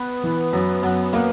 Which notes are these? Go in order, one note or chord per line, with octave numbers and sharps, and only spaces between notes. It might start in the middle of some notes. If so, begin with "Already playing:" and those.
Already playing: B3
E3
F#2
F#2 B3
A#3 B3